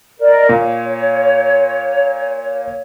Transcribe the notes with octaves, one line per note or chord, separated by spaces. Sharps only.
A#4 D5 D#5
A#2 C#5